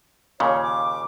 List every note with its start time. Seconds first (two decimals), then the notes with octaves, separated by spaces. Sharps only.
0.40 D#2 A#2 C#3 C#5
0.62 D6